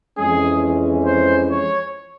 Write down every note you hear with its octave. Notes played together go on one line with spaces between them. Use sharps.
F2 E3 G#3 C#4 G#4
C5
C#5